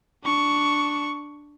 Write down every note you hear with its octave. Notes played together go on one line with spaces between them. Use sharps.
D4 C#6